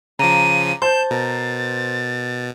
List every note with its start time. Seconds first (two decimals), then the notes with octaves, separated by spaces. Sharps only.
0.19 C#3 F3 A#5 D6 D#7
0.82 C5 A5 G6 E7
1.11 B2 A#4 A6